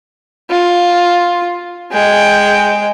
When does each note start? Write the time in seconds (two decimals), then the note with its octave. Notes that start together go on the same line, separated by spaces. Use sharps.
0.51 F4
1.92 G#3 G5